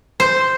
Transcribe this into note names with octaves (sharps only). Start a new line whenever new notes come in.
C5